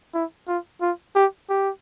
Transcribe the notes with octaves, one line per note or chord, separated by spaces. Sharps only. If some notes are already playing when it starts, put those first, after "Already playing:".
E4
F4
F4
G4
G4